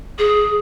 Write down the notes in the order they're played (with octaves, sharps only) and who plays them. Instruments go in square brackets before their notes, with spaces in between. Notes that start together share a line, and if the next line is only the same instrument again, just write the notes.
[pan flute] G#4